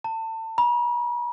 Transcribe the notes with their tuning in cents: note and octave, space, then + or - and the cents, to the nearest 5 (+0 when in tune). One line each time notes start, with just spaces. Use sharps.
A5 +30
B5 -45